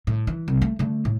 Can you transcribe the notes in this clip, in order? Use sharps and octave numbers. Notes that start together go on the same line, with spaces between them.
A2
E3
C2
A3
D3 A3
A2